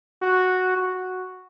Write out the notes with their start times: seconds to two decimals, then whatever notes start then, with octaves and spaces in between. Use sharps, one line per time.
0.22 F#4
0.76 F#4